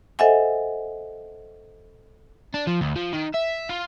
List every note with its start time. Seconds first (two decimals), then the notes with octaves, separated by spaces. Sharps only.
0.19 A4 C5 D#5 E5 F#5 G#5
2.54 D4
2.67 F3
2.81 D2
2.96 F3
3.13 D#3
3.34 E5
3.69 F4